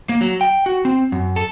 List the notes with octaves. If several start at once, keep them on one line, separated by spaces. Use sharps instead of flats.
A#3
F#3
G5
F#4
C4
F#2
A4